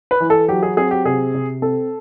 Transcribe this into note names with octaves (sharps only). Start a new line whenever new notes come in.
B4
E3
A4
F#3 G4
G#4
C4 G#4
G4
C3 G#4
C3
C4 A4